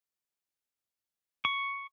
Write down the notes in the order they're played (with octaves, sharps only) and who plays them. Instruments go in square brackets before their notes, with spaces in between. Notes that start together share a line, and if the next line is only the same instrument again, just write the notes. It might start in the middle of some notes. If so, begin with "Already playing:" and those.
[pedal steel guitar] C#6